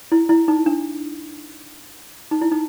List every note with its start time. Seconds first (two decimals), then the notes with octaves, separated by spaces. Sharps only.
0.12 E4
0.29 E4
0.48 D#4
0.66 D4
2.31 D#4
2.41 E4
2.52 D#4